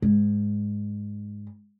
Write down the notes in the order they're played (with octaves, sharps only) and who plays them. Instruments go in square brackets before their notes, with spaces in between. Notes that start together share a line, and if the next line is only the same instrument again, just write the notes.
[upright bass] G#2